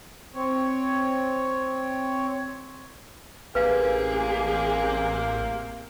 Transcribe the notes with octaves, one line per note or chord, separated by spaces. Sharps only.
C4 C#5
A1 C3 A#3 G#4 B4 F5